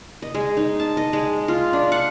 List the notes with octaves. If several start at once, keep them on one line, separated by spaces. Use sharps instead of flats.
D#5
G#3
D#4
A5
D#5
G#3
F4
D4
F#5